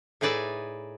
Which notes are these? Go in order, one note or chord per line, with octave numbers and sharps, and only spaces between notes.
A2 D#4 G#4 B4 D5 E5